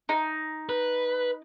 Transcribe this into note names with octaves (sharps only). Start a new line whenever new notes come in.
D#4
B4